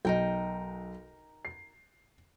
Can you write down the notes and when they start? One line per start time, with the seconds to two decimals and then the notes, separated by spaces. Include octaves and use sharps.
0.05 B1 D#4 A#4 G5
1.45 C7